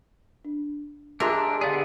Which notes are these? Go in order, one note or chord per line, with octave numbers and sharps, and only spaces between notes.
D4
G#3 D4 F4 G4 A#4 E5 E6
D3 B3 G#4 D5 F5